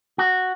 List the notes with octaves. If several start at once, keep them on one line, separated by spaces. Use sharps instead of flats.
F#4